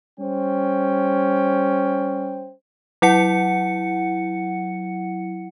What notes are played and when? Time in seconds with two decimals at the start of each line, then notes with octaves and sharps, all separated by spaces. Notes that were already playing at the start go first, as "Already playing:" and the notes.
0.19 G3 C#4 C5 G5
3.02 F#3 E4 F#5 C#7